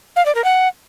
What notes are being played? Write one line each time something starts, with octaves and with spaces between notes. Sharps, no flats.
F5
D5
A#4
F#5